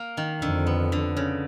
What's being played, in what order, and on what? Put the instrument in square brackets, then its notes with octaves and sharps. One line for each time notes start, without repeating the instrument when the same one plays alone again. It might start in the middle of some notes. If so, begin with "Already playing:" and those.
Already playing: [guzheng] A#3
D#3
[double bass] F2 [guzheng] D3
[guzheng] B3
D3
C#3